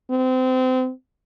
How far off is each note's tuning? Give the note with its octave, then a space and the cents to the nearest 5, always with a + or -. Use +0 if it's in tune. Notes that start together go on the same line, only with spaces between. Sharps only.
C4 -30